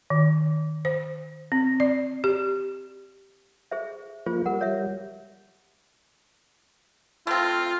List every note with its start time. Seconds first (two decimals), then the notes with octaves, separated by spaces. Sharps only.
0.10 D#3
0.85 C5
1.52 C4
1.80 D5
2.24 G4
3.71 G#4 C5 E5
4.26 F3 A#3 F4 G#4 C5
4.46 G3 A#4 F#5
4.61 C#5 E5
7.27 A3 C4 F4